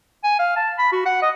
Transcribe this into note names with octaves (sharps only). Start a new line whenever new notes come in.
G#5
F5
A5
B5
F#4
F#5
D#5